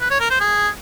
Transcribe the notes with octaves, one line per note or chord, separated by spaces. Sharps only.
B4
C#5
A#4
C5
G#4